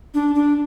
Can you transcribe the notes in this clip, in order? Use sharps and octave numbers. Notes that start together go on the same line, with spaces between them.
D4
D4